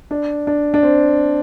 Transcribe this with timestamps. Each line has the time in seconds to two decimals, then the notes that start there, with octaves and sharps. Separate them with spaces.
0.11 D4
0.47 D4
0.74 D4
0.83 C4